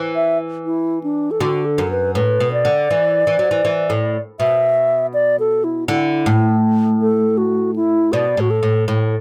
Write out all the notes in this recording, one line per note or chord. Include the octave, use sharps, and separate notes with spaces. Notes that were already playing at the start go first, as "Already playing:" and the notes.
Already playing: E3
E5
E4
D4
A4
D3 F#4
A4
F#2
B4
A2 B4
B2
D5
D3
E3
E3
F#3
E3
E3
A2
B2 E5
D5
A4
E4
D3 E4
A2
A4
F#4
E4
B2 D5
A2 F#4
A4
A2
A2